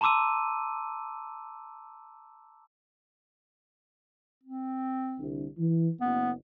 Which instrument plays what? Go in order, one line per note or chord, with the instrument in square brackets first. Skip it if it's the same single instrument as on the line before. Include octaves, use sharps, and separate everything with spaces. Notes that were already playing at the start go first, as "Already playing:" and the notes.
[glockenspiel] A5 A#5 C6 D6 E6 D#7
[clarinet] C4
[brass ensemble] C2 D3
E3
[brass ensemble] F#1 [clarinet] B3